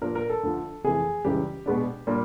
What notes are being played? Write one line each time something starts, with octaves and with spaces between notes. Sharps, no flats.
A#2 F3 A#3 D4 A#4
A#4
A4
D2 D3 F3
F2 C3 E3 A3 G#4
C#2 C#3 E3 G3 G4
B2 G#3 B3 D4
A#2 G3 A#3 D4